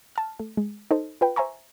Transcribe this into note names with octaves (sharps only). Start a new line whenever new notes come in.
A5 F6
A3
G#3
D#4 A4 C5
F4 B4 G5
C5 E5 G#5 A#5 C#6